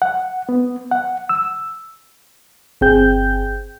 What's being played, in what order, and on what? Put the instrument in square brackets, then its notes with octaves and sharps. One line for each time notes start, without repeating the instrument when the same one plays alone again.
[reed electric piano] F#5
B3
F#5
E6
[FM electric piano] G1 C4 G#4 G5 G6